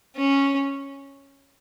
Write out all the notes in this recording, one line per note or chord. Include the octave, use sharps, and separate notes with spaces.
C#4